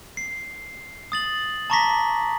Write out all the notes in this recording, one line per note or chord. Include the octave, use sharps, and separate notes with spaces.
C7
D#6 A6 F#7
A5 A#5 C#6 D6 A#6 B6